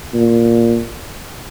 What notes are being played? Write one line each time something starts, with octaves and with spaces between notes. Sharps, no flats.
A#2